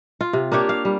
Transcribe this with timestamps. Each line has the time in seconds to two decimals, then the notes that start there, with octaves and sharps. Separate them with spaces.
0.21 F4
0.33 C3
0.52 A#3 D4 G4 C#5
0.69 F5
0.85 G3